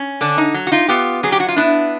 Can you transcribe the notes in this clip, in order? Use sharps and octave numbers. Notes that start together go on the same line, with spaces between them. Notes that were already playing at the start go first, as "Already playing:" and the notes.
Already playing: C#4
D3 D4
D#4
F#3
F#4
D#4 F4
B3 F4 G4
F#3 G#4
G4
F#4
F4
B3 D4 E4